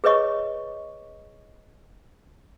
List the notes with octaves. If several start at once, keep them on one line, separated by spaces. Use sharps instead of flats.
G#4 B4 C#5 D#5 C#6